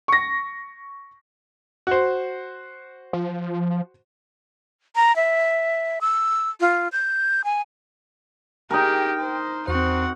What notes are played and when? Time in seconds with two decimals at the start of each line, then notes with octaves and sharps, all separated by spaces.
0.08 C#6 A#6
1.87 F#4 C5
3.13 F3
4.96 A#5
5.16 E5
6.01 E6
6.60 F4
6.92 G6
7.44 G#5
8.71 D#4 G4 G#4 A#4 G5
9.20 C5
9.67 E2 C4 F#4 C5 F#5